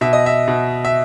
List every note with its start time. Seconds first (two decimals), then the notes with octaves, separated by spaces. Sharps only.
0.01 B2 E5
0.13 D#5
0.26 E5
0.48 B2
0.85 E5